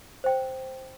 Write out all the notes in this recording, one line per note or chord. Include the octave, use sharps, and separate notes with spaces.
C5 G5